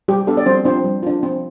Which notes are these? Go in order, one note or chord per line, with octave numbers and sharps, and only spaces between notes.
G3 G4
B3 D4 G4 A4
D5
G3 C4 C5
C4 D4 F4 C5
G3
D4 F4
C4